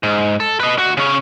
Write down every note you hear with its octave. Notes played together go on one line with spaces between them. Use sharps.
G#2
A4
B4 D#5
D2 F#4
C#3 C#4